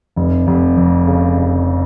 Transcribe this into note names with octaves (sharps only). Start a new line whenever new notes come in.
F1
F1
F2
C#3
F1